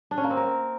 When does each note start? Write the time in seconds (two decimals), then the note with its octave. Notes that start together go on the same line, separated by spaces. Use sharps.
0.11 D4
0.18 C#4
0.24 A#3
0.30 C4
0.37 A#4